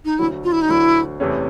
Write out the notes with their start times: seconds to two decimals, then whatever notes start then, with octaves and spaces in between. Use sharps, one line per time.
0.05 D#4
0.19 D2 D3 F#3 E4
0.44 F4
0.52 E4
0.62 D#4
0.69 D2 D3 F#3 E4
1.20 E2 C3 E3 A3 C#4